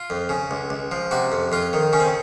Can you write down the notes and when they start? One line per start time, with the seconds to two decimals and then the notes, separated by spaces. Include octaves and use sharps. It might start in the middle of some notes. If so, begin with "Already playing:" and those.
Already playing: F4
0.10 F2
0.29 C#3
0.51 C#2
0.70 C#2
0.91 F3
1.11 C3 F#4
1.32 F2
1.52 F2 F4
1.73 D#3
1.93 C#3 C#4
2.00 C4